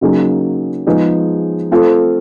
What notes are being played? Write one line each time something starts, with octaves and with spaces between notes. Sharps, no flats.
C#3 F#3 A#3 D#4 G#4
F3 G#3 B3 D#4 G#4
A3 C4 F4 A4